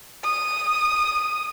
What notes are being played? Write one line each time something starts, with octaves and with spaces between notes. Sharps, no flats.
D#6